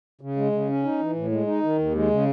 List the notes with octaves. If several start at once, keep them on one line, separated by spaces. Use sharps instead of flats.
C#3
G#3
C#3
C#4
D#4
E3
A2
G#3
D#4
D#3
D#2
G#3
C#3